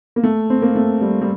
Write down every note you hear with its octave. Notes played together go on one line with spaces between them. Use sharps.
A#3
A3
C4
A#3
A3
G3
G3